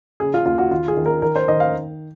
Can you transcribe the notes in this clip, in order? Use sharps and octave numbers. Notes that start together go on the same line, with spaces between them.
C#3 G#4
F4
D#2 F4
F#4
D#3 F4
G#4
D#3
A#4
D#3 A#4
C5
D#3 D#5
F5